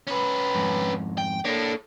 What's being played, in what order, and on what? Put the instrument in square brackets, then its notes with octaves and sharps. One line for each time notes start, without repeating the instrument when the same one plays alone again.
[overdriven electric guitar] C#4 B4
[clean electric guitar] F2 G#2
[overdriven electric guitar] G5
[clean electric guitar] A#3 D4 [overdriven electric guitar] A4 C#5